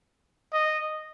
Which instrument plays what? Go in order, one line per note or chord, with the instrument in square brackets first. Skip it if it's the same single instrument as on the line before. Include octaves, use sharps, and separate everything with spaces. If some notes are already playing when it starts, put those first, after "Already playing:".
[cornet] D#5